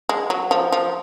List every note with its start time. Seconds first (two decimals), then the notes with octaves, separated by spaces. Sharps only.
0.09 G#3
0.30 F#3
0.51 F3
0.72 F3